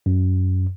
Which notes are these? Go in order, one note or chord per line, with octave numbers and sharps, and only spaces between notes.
F#2